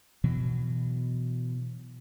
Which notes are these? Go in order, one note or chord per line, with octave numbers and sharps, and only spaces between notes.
B2 E3 F#3